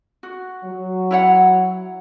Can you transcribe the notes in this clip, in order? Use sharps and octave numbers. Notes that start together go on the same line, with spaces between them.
F#4
F#3
E4 C#5 F#5